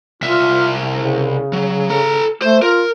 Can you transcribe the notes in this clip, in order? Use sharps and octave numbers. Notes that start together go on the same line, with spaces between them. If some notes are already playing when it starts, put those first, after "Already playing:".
C2 F4 E5
C#3
F#3
A4 A#5
A3 C5
F4 A#4